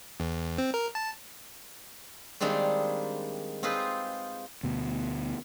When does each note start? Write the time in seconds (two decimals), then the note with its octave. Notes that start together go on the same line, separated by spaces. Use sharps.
0.20 E2
0.58 C4
0.74 A#4
0.95 A5
2.40 D#3 G3 G#3 A#3 C4 D4
3.63 C4 D#4 F4 G#4 B4
4.63 D2 B2